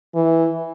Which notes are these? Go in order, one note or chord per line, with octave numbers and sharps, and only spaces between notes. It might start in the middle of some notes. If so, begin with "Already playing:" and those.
E3